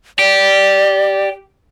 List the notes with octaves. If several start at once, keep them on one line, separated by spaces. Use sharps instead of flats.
G4 D5